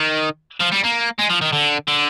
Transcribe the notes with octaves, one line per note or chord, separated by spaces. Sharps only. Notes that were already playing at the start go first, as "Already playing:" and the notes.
Already playing: D#3
F3
G3
A#3
G#3
F3
D#3
D3
D3